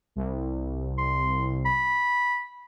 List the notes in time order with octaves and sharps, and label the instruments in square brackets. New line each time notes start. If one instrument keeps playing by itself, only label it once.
[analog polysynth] C2
[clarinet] C6
B5